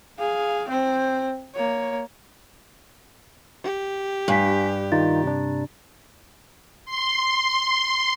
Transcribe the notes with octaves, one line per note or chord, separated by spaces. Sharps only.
G#4 F5
C4 C5
A#3 C#5
G4
G2 F5 G#5 B6
D#3 D#4 F4 A#5 A6
C3 D4
C6